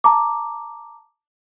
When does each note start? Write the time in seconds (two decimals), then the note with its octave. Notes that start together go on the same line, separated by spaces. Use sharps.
0.04 A5 A#5 D6